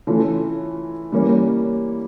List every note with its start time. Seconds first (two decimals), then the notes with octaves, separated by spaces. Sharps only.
0.07 E3 A3 C#4 F4
1.12 E3 G3 A#3 C#4